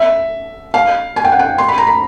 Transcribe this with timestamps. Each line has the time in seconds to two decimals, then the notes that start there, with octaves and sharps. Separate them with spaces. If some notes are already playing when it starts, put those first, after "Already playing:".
Already playing: E5
0.74 F5
1.16 G#5
1.24 G5
1.32 F#5
1.39 G5
1.58 C6
1.68 B5
1.78 A#5
1.87 B5